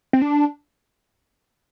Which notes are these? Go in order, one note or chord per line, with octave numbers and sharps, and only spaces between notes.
C4
D4